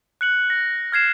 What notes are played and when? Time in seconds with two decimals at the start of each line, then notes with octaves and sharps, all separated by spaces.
0.21 F#6 C#7 F#7
0.50 A#6
0.92 F6 G#6 C7 E7